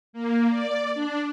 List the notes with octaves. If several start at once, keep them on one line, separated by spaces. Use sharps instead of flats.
A#3
D5
D4